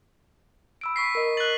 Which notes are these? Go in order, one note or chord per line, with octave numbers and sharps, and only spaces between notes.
B5 E6 D7
C#6 B6 C7
A#4 D#5
F#6 A6 F#7